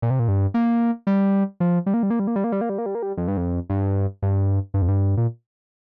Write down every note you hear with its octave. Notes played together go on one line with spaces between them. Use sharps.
A#2
C3
A#2
G2
A#3
G3
F3
G3
A#3
G3
A#3
G3
A#3
G3
A#3
G3
A#3
G3
A#3
G3
A#3
G3
F2
G2
F2
G2
G2
G2
F2
G2
A#2